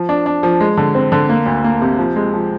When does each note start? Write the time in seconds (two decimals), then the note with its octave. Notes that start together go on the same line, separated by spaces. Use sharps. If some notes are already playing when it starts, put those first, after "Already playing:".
Already playing: F3
0.09 D4
0.26 D4
0.43 F3
0.60 G#3
0.77 D3
0.95 C4
1.12 D3
1.29 A#3
1.46 D2
1.64 A#3
1.82 C3
1.98 F3
2.16 G#3
2.33 F3